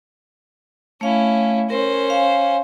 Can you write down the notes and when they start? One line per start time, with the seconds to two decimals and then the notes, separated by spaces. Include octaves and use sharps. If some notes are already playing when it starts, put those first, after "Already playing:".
1.01 A3 C#4 E4 F5
1.70 C#4 A#4 C5
2.10 F5 G#5